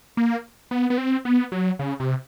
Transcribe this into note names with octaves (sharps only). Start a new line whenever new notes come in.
A#3
B3
B3
C4
B3
F#3
C#3
C3